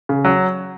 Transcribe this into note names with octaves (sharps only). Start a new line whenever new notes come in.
C#3
F#3